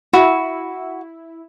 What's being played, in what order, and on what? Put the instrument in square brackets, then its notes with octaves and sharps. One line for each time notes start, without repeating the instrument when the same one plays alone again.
[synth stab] E4 [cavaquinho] F#4